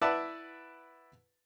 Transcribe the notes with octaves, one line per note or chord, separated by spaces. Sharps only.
E4 B4 D5 E5 F#5 A5